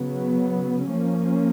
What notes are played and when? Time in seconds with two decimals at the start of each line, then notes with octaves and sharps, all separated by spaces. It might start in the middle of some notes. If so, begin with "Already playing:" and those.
Already playing: C#3 F#3 B3
0.91 F3 A#3 C#4